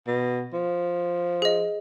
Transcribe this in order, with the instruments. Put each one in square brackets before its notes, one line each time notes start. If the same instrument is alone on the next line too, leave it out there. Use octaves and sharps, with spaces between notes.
[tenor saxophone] B2
F3
[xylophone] G#4 D#5